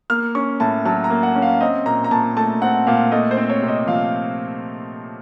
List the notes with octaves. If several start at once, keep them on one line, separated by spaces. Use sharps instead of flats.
A#3 F6
C#4 C#6
A2 A5
F#3 A5
A#5
A#3
F#5
C#4
F5
C4 D#5
A#2 A#5
A#5
A#2 A5
A3 A5
C4 F#5
A#2 F5
A3 D#5
C5
C4
C#5
C3
D#5
F3 F5